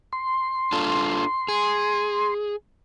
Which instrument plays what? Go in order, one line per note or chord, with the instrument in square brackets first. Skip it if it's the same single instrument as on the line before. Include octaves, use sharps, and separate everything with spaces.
[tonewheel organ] C6
[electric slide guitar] D4 F4 A4
G#4